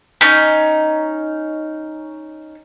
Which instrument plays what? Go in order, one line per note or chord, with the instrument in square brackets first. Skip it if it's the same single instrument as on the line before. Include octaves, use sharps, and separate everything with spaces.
[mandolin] C#4 D#4